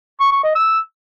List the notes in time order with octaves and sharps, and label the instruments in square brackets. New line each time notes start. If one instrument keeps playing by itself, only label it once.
[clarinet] C#6
C#6
D#5
E6